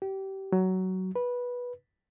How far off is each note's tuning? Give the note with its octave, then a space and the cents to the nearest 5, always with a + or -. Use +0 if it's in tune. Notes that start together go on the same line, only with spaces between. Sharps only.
G4 -25
F#3 +15
B4 -15